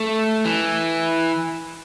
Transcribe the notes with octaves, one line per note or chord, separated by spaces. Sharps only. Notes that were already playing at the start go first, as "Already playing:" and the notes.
Already playing: A3
E3